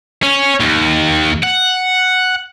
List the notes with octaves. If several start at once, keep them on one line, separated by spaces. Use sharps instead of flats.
C#4
D#2
F#5